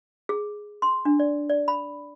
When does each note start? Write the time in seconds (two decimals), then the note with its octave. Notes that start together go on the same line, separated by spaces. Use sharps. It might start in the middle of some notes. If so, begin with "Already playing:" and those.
0.29 G#4
0.82 C6
1.05 D4
1.20 D5
1.49 D5
1.68 B5